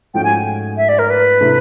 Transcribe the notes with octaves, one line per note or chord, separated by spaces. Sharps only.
G#2 F3 A3 C#4 F#4 G5
G#5
E5
D5
A#4
B4
C3 E3 A3 D4